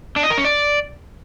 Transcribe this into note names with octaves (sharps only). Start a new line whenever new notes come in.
D4
D#5
A#4
C#4
D5